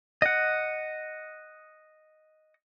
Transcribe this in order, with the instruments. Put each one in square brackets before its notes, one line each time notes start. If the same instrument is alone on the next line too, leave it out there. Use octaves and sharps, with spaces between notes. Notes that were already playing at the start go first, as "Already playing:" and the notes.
[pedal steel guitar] D#5 F#5